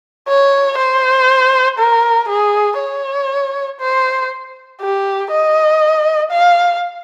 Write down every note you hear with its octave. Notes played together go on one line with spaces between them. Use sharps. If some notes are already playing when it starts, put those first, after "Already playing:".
C#5
C5
A#4
G#4
C#5
C5
G4
D#5
F5